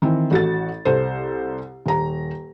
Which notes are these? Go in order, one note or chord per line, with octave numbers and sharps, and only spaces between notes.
D#3 E3 C4
A1 F#4 A4 A6
C2 A4 C5
D#1 A#5